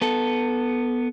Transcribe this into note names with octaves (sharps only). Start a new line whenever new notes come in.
B3 A4